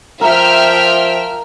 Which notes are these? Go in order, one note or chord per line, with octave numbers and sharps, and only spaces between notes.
F3 A#4 E5 G5 F6